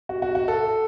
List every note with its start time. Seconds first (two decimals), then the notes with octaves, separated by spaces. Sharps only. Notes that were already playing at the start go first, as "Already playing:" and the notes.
0.09 F#4
0.22 F#4
0.35 F#4
0.48 A4